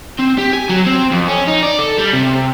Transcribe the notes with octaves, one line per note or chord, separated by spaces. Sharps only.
C4
G4
G#5
F#3
C4
F2
C#4
D#4
D5
A4
G3
C3